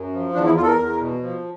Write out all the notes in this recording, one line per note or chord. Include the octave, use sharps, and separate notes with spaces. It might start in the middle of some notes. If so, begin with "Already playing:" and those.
Already playing: F#2
F3
E2 D4
E4
E2 F4
A4
A#4
E2
B2
F3